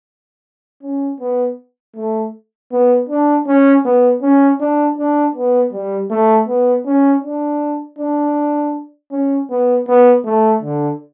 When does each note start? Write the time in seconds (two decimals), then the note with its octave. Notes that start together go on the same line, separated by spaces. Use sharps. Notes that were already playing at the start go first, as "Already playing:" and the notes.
0.83 C#4
1.20 B3
1.96 A3
2.72 B3
3.09 D4
3.47 C#4
3.85 B3
4.22 C#4
4.60 D4
4.98 D4
5.35 B3
5.72 G3
6.10 A3
6.48 B3
6.86 C#4
7.24 D4
7.99 D4
9.11 C#4
9.50 B3
9.88 B3
10.25 A3
10.62 D3